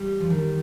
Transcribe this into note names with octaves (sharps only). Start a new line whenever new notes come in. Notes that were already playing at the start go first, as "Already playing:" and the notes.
Already playing: G3
F3
D#3 G3